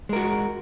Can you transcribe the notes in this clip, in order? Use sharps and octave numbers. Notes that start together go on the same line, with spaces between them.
G#3 F#4 A#4